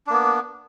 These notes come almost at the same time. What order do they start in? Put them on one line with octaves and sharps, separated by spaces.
D4 A#3 B3